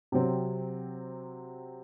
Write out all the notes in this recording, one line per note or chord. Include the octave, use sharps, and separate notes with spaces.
C3 F#3 C4